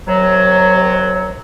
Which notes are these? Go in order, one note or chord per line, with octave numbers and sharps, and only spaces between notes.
D#2 C3 F#3